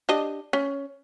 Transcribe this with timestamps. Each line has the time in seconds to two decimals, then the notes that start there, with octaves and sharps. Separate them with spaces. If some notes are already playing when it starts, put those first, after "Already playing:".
0.09 D4 G4 D#5
0.53 C#4